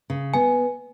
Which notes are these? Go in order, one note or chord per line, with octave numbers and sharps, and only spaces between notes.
C#3
B3 G#5